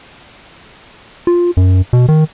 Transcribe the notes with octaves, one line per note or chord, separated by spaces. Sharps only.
F4
F#2
B2
D#3